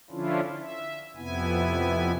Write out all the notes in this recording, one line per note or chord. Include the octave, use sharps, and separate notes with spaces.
D3 F3 C#4 D4 E4 F4
E5
F2 C3 B3 E4 G#5